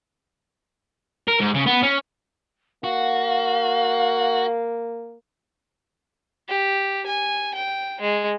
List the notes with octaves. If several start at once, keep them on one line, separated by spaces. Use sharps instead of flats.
A#4
G#2
C#3
B3
C#4
A#3 F#4 F5
G4
G#5
G5
G#3